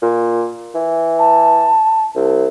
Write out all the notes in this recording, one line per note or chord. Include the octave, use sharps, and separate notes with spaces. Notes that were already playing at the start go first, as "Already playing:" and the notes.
A#2
E3
A5
C2